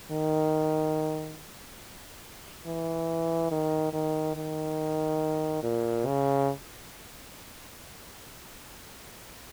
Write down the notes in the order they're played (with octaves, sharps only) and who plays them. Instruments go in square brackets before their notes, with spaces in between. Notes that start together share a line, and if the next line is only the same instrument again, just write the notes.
[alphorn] D#3
E3
D#3
D#3
D#3
A#2
C#3